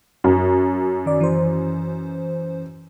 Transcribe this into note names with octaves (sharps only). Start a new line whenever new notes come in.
F#2
D#3 D5
E3 C5